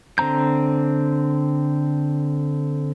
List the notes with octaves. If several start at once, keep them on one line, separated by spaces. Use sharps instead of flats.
D3 C4 A#5 G6